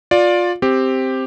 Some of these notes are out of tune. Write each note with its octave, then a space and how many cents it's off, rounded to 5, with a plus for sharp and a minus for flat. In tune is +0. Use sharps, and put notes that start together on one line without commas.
F4 +20 D5 +0
C4 +0 G4 +5